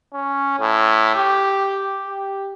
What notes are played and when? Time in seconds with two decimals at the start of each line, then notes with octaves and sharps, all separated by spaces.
0.13 C#4
0.60 A2
1.16 G4
2.07 G4